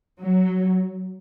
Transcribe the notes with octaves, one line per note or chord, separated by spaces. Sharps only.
F#3